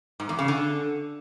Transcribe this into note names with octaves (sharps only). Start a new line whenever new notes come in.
G#2
E2
C#3
D3